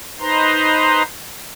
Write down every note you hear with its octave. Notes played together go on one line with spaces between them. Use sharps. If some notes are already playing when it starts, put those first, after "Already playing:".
D#4 B4 C5 A#5 C6